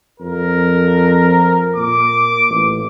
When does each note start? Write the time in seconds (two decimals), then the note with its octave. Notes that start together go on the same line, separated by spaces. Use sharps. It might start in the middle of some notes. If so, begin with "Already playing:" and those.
0.20 F2 A#4
1.76 A#2 D6
2.50 A1